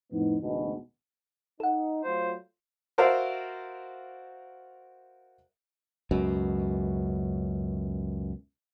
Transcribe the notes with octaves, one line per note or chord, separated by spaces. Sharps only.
F2 A2 B3 D#4
A1 D2 G#2 B2
D#4 A4 F#5
F#3 A3 F4 C5
F#4 A#4 C5 D5 E5 F5
C#2 F#2 B2